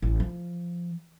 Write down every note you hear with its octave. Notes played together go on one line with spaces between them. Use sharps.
A1
F3